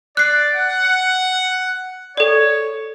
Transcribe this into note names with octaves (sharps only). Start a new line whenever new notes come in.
D5 F#6 C7
F#5
A4 C#5 D5